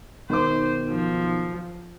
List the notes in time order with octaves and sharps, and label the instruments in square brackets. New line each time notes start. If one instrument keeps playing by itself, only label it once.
[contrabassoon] B1 [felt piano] D#3 D6 [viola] C5
[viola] F3